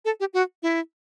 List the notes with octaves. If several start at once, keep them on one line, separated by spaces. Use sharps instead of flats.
A4
G4
F#4
E4